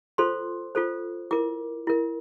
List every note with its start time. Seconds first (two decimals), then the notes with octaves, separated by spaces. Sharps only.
0.18 F4 A4 C5 C6
0.75 F4 A4 C5
1.31 E4 A#4 D6
1.87 E4 A#4